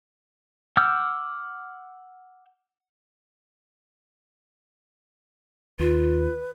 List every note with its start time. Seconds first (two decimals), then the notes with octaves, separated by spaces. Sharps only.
0.77 F#5 D6 E6 F6 G6
5.79 D#2 F4 B4